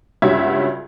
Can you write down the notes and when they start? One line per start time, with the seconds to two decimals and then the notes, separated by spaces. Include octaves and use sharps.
0.22 C#2 G2 C#4 F#4 E5 G#6